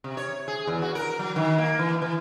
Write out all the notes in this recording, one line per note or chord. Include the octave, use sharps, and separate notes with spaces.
C3
C#5
G#4
E2
F#4
A#4
F#3
D#3
A#3
E3
E3